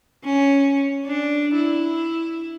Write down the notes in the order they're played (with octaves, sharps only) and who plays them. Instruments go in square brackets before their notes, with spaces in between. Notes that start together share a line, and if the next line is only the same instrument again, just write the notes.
[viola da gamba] C#4
D4
E4